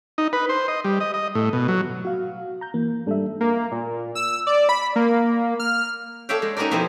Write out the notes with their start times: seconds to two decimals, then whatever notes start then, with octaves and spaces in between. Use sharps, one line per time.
0.18 D#4
0.33 B4
0.49 C5
0.68 D#5
0.84 G3
1.00 D#5
1.14 D#5
1.35 A2
1.53 B2
1.68 F#3
2.05 F#4 F5
2.61 A#5 G6
2.74 E3 A#3
3.06 G#2 G3 G#3 D4 A4 E5
3.41 A#3
3.72 A#2
4.15 E6
4.47 D5
4.69 B5
4.96 A#3
5.60 F6
6.29 A4 C#5 D5 E5 F5 G5
6.42 G#3
6.57 C#4 D#4 F#4 G4 A#4 D5
6.71 F2 B2 C4 E4 G#5